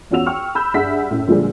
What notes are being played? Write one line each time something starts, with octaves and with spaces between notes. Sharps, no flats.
E2 C#4 F4 F#4 E6 F7
G5 C#6 F6
B5 E6 F6 G6
G2 G#4 E5 F#5 B5 B6
F#2 A2
A#2 D3 F3 G3 G#3 A#3